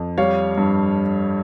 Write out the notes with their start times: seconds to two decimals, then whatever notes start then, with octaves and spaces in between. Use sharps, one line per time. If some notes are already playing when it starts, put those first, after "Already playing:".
Already playing: F2
0.18 G3 C#5 F5
0.58 G2